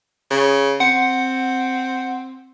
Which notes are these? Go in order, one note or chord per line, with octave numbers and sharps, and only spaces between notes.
C#3
C4 F#5